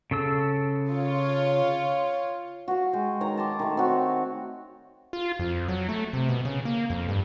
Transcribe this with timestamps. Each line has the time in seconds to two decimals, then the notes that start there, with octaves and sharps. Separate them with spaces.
0.11 C#3 A4 E6
0.90 F4 C#5
2.68 F#4 F5
2.93 G#3 G5
3.21 D#3 C#5 A#5
3.37 A5 C6 D6
3.59 D#3 A3
3.77 C4 F#4 C#5
5.13 F4
5.39 F2
5.68 F#3
5.89 A3
6.13 C3
6.29 B2
6.45 C#3
6.65 A#3
6.90 F2
7.08 G2